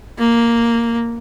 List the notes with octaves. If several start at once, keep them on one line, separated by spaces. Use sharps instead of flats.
A#3